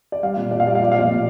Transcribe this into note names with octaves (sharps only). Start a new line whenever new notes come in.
D5
G3 F5
A#2
A#2 D5
F5
G3 D5
F5
F3 D5
F5
A#2
D5
A#2